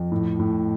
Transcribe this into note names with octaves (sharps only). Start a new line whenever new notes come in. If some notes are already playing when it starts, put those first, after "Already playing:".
Already playing: F2
A2
A2